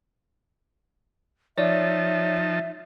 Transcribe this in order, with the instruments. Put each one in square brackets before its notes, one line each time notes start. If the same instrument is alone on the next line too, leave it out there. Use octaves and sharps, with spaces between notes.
[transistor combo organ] F3 D#4 A5 [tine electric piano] C#5 D5 [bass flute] E5